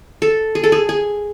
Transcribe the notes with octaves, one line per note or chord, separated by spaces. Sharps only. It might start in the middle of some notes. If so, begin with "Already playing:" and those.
A4
G#4
A4
G#4
G#4